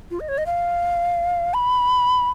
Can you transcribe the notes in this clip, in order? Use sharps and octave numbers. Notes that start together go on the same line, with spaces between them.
F4
D#5
C#5
D#5
F5
B5